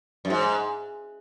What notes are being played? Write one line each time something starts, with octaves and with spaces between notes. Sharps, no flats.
F#2
G#2